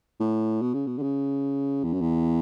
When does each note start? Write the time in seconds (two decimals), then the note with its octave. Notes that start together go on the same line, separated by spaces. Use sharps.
0.20 A2
0.61 B2
0.74 C#3
0.86 B2
0.98 D3
1.02 C#3
1.83 E2
1.93 F#2
2.01 E2